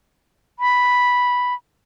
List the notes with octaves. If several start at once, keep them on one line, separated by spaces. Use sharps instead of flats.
B5